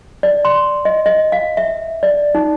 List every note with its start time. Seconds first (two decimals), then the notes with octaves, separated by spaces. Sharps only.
0.23 D5
0.45 C6
0.85 D#5
1.06 D#5
1.32 F5
1.57 E5
2.03 D5
2.35 D#4